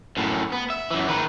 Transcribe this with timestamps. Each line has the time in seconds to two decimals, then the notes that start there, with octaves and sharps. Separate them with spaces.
0.17 F#2 A2
0.52 B3
0.70 E5
0.91 F#2 E3
1.08 D#3 B4